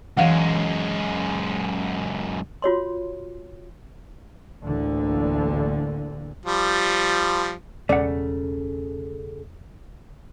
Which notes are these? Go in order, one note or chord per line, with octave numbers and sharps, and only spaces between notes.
F#2 E3 G#3 F5 F#5
F4 F#4 C#5 C6
A1 D2 D3 A#3
F3 G3
E1 C#3 A3 D5 F#5